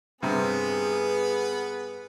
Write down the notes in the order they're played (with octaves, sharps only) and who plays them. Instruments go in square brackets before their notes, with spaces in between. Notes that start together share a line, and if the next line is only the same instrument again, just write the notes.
[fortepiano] G2 C3 C4 [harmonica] B3 [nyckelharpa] G#4 B4